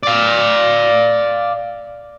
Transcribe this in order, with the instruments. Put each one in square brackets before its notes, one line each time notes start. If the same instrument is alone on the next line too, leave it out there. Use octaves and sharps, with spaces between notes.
[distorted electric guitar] D5 F5